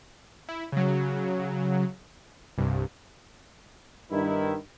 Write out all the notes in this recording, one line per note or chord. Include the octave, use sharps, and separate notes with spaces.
E4
C#3 F#3
C2 G2
G2 D#3 E4